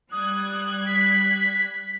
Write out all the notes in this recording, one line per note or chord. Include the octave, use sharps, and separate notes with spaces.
G3 D#6 F#6 G#6
B6